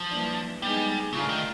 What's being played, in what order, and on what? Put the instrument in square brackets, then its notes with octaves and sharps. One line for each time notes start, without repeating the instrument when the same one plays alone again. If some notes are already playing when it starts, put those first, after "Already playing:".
Already playing: [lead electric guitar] F3
[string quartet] E3 G3 A#3 D4
[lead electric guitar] G3 [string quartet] G#3 B3 D#4 G#4
[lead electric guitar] C#3 [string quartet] A3 D4 F4 A#4
[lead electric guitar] D#3